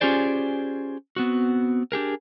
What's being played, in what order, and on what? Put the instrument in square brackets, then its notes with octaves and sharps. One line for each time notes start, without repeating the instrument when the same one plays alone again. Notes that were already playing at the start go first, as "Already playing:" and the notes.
[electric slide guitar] C#4 F4 G4 G#4 C5 D5
B3 C4 F#4
D4 G4 G#4 A#4